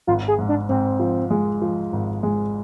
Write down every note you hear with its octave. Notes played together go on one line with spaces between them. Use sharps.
G#1 F4
G#4
G#2
D4
G#2 C4
F3
G#3
F3
G#1
G#3